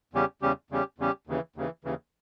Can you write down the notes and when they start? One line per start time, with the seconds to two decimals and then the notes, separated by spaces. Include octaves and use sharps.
0.13 E2 C#3 G3 C#4 G4
0.42 E2 C#3 G3 C#4 G4
0.70 E2 C#3 G3 C#4 G4
0.98 E2 C#3 G3 C#4 G4
1.27 D#2 C#3 E3
1.56 D#2 C#3 E3
1.84 D#2 C#3 E3